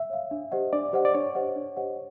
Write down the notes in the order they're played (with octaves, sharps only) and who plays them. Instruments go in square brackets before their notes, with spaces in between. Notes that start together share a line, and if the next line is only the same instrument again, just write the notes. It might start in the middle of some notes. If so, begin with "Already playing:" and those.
Already playing: [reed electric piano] E5
[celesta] C#5 F5
D4
G4 C5 D#5 F#5
[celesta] D4 [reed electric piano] D5
[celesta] G4 C5 D#5 F#5
[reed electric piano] D5
[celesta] D4 [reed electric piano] C#5
[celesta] G4 C5 D#5 F#5
D4
G4 C5 D#5 F#5